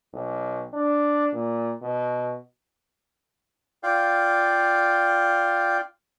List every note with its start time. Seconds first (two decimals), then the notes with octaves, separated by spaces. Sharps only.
0.13 B1
0.73 D4
1.33 A#2
1.82 B2
3.83 F4 D5 F5 G5